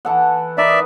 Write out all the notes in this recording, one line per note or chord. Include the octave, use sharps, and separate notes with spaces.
E3 A4 F#5
D#4 A#4 B4 D5 E5